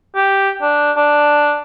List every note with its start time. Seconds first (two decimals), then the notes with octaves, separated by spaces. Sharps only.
0.15 G4
0.61 D4
0.97 D4